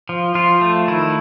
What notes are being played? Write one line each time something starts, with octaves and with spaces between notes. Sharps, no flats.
F3
F3 F4
A3
D#3 E4